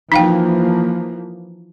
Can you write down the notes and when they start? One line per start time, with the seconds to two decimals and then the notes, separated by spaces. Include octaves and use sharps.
0.12 E3 F3 A#3 D#4 F5 G5